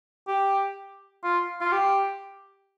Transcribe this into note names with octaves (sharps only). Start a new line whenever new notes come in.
G4
F4
F4
G4